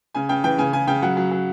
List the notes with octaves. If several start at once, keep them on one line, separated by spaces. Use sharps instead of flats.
C#3 G#5
C#3 G5
E3 G5
C#3 G#5
C#3 G#5
C#3 G5
F#3 F#5
F#3
F#3